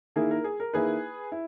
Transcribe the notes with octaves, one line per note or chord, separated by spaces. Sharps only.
D#3 A#3 E4 G#4
A#4
G#4
A#4
D#3 A#3 E4 G#4 B4
E4